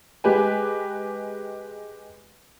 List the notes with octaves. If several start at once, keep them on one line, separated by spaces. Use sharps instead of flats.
G#3 G4 B4 G#5